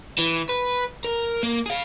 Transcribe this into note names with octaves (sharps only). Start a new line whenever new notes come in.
E3
B4
A#4
A#3
G#4 F5